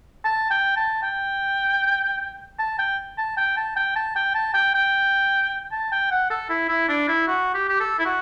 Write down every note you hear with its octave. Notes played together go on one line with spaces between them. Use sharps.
A5
G5
A5
G5
A5
G5
A5
G5
A5
G5
A5
G5
A5
G5
G5
A5
G5
F#5
A4
E4
E4
D4
E4
F#4
G4
G4
A4
E4
F#4